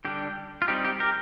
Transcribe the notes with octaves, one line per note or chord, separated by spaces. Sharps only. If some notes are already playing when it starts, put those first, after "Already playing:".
D3 G3 D4 G4
F4
G3 C4 D#4 G4
G4
G4 A#4